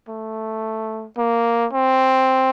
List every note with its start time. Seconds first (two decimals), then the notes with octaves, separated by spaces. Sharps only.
0.09 A3
1.18 A#3
1.73 C4